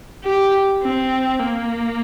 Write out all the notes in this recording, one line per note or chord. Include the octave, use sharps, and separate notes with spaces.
G4
C4
A#3